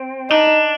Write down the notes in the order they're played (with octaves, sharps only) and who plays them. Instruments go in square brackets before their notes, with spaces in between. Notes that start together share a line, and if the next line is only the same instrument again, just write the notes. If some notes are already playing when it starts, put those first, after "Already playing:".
Already playing: [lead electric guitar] C4
[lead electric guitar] D4 [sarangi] D#4